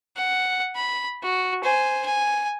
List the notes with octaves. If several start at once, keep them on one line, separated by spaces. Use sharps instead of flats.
F#5
B5
F#4
C5 G#5
G#5